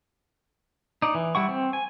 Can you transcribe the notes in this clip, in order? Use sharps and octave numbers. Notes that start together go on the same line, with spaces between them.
D#4 D5
E3
G3 E4 F#5 C#6
C4
G#5